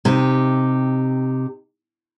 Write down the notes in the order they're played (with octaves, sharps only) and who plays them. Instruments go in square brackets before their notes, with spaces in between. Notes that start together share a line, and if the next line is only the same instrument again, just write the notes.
[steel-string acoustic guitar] C3 D#4 G4